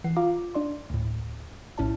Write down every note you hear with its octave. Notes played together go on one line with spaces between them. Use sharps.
E3 F#5 C7
F4 F5 A#5 D6
D4 D5 C6
D2 A2
A#1 A2 C#4 E4 D5 A5